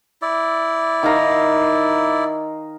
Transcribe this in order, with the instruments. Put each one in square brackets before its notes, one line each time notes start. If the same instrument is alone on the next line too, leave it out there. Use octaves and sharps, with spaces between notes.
[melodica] E4 D5
[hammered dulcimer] D#3 F5 A#5